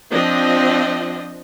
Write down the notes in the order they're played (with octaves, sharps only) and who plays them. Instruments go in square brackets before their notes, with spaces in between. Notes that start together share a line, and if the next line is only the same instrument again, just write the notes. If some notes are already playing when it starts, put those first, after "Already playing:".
[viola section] F3 C4 D4 D#5